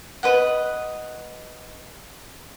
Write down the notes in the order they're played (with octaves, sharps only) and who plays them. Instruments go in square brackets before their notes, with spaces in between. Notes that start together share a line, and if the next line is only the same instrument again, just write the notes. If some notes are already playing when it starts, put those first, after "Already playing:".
[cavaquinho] B4 D#5 F#5